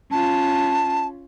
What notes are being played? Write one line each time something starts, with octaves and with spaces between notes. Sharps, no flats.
C#4 F4 A5